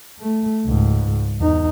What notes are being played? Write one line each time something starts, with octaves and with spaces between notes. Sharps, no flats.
A3
C#2 G#2
E2 D#4